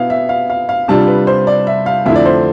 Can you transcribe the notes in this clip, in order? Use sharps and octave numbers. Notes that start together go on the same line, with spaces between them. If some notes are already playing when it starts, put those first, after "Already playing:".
Already playing: B2 B3 E4 E5 F5
E5
F5
F5
F5
C3 G3 D4 F4 A5
B4
C5
D5
E5
F5
F2 D3 A3 E4 E5
D5
C5